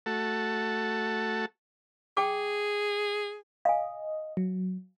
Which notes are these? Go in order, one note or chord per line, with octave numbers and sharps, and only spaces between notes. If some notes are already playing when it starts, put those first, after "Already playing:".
A3 F#4 A4
G#4 G5 D6
D#5 F5 G#5
F#3